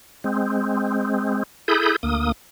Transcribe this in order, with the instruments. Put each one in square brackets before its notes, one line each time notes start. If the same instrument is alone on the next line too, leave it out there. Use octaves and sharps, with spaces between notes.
[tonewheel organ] G#3 C4
E4 G#4 A4 B5 D#6 G6
D2 A#3 D#6